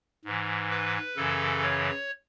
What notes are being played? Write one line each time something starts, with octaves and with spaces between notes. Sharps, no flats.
G#2 E3
B4
F#2 C#3 E3 A4
C#5